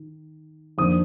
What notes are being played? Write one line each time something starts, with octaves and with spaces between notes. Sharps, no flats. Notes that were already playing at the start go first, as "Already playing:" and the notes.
Already playing: D#3
F2 D#3 A#3 D4 D#6